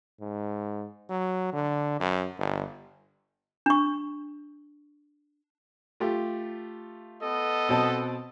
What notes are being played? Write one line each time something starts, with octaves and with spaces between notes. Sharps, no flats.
G#2
F#3
D3
F#2
G1
D4 C#6
A3 F4 G4
B3 A4 D#5
B2 C4 A5